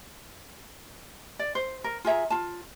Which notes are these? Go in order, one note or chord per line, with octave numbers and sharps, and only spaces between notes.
D5
C5
A#4
F4 G#4 E5 A#5
F4 A5